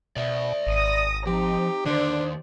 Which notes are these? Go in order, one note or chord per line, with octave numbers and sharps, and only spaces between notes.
B2 D5 E5
G#1 D#6 A#6
F3 C4 D#4 G4
D3 D#3 D4 G4 C5 D5